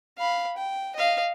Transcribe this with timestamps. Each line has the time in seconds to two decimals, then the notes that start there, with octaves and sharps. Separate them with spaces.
0.18 F5 B5
0.57 G5
0.96 D#5 F5